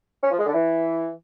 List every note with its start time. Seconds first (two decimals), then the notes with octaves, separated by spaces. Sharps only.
0.24 C#4
0.31 F3
0.39 G#3
0.47 D3
0.54 E3